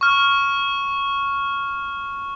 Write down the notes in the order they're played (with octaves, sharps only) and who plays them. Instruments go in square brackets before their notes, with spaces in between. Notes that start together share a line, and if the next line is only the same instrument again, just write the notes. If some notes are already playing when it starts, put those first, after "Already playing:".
[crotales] C#6 F6